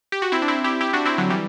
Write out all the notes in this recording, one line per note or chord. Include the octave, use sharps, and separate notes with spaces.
G4
F#4
C4 E4
D4
C4 E4
E4 G4
E4 G4
D4 F#4
C4 E4
D3 F#3
E3 G3